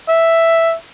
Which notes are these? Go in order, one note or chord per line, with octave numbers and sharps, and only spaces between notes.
E5